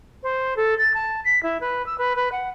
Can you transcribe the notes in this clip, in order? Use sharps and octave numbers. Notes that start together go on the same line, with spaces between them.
C5
A4
A6
A5
B6
E4
B4
E6
B4
B4
F#5